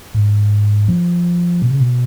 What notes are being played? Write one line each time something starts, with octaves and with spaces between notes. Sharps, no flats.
G#2
F3
B2
C#3
B2